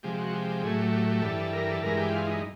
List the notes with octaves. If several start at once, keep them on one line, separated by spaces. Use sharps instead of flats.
C3 F3 G#3 G4
F#4
G4
A2 F#3 A3 G#4
G4
G4
G4
G2 E3 G3 A4
A#4
A4
G2 E3 G#3 A#4
G4
F4
D#4